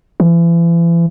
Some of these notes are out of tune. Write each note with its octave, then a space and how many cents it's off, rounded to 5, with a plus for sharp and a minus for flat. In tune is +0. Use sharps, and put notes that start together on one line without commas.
E3 +40